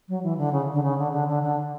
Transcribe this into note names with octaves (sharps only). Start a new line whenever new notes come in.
F#3
E3
D3
C#3
D3
C#3
D3
D3
D3
D3